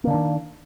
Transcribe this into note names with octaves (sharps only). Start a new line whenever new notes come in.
D3 D#3 A#3 D4